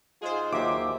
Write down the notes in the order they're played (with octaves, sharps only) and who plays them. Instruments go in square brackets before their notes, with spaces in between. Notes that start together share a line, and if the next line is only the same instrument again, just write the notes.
[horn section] G#2 G#3 F4 [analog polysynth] G#4 C5
[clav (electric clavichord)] D#2 F#3 D#4 [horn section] F4 E5 [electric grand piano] D6